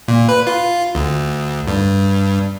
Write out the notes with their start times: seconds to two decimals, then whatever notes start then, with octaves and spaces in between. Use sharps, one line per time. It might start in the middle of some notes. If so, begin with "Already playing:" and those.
0.08 A#2
0.29 B4
0.47 F4
0.95 D2
1.68 G2